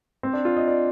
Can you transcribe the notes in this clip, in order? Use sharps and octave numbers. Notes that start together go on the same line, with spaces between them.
C4
D4
F4
D#5
D5